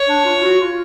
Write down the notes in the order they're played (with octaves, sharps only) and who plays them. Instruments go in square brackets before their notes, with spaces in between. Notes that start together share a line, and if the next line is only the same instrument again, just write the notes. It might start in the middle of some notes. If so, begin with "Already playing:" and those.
Already playing: [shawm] C#5
[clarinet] D4
F4
F#4
F4